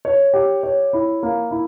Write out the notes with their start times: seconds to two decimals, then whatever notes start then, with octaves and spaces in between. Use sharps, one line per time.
0.05 C#5
0.34 G4
0.63 C#5
0.93 E4
1.23 A#3
1.51 E4